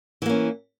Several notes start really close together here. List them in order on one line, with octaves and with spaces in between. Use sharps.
E3 A#3 C#4